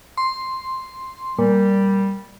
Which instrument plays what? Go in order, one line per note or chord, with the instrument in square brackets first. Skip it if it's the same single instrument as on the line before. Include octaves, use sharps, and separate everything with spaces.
[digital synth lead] C6
[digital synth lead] A#2 [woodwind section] G3